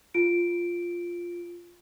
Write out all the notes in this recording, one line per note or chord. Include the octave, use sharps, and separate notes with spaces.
F4 D7